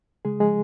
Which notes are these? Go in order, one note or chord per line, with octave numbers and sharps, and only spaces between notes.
C#3 G#3 G#4
F3 G#3 G#4